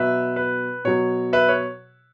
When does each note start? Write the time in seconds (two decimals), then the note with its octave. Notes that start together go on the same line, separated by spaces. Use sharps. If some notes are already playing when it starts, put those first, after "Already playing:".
Already playing: B2 F#3 B4 E5
0.36 B4
0.85 B2 F#3 C#5
1.33 B4 E5
1.49 C#5